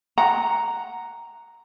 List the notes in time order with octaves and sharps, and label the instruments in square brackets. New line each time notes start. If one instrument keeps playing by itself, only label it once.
[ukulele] F#5 A#5